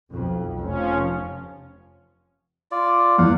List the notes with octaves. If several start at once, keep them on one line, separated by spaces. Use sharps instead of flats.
B1 F2
F1 F3 C#4
F4 D5
E2 F5 F#5